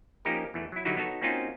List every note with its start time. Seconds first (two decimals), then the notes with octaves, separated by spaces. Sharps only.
0.25 F3 A#3 C#4 D#4 G4 A#4
0.54 E2 E3 A3
0.72 F#3 E4
0.85 D3 F#3 G3 D#4 E4 F#4
0.97 B3 D#4 F#4 A4 C#5
1.22 A#3 C4 C#4 D#4 F4 F#4